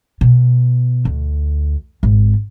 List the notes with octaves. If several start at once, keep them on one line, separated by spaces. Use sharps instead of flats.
B2
D2
G#1